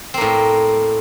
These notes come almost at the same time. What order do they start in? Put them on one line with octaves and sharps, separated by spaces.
C4 A#3 A2